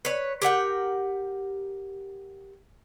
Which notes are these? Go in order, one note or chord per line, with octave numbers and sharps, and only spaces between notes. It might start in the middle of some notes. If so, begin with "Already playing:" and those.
B4 C#5
G4 A#4 F#5 G5